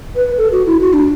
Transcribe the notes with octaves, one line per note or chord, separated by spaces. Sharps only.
B4
A4
F#4
E4
F#4
D4